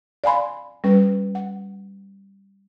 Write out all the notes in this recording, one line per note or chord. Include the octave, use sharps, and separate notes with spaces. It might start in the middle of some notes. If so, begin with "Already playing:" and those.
D5 F5 G#5 B5 C6
G3 C#4 B4
F#5